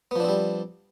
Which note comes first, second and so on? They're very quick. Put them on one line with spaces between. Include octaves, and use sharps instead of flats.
B3 F3 D4 C4 G3